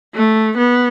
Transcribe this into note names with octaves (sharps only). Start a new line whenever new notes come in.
A3
B3